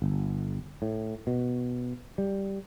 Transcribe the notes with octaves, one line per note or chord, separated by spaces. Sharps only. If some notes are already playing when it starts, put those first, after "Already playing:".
G1
A2
B2
G3